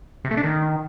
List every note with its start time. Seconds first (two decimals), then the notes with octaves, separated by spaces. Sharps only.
0.25 C3
0.31 A3
0.37 D4
0.44 D#3